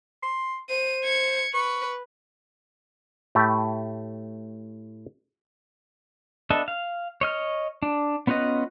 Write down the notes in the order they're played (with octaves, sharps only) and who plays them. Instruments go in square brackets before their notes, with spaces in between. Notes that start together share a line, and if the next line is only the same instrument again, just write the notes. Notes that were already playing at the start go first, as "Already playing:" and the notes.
[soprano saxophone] C6
[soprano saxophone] C5 [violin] D#7
[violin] G#6 C#7
[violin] B4 [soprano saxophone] C#6
[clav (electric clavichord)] A2 A3 G4
[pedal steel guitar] B3 D4 A4 D#5 E5
F5
C#5 D#5 F6
D4
B3 C#4 F4 B4 D#5